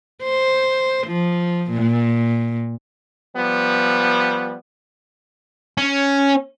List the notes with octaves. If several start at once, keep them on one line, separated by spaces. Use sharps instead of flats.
C5
F3
A#2
F3 G3 B3
C#4